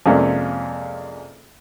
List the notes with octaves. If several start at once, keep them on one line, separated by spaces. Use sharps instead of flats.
F2 C3 G#3 A#3 C#4 D4